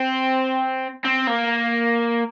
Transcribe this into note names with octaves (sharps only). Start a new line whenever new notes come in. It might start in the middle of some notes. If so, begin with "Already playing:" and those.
Already playing: C4
C4
A#3